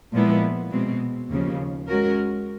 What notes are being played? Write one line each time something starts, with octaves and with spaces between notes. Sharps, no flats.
A#2 F3 G#3 B3 E4
B2 G#3 C4
D#2 C#3 F3
G#3 C#4 F#4 A#4